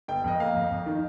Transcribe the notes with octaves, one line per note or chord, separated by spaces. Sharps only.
G1 G5
F2 D#5
A#3 F5
F2
F2
D#3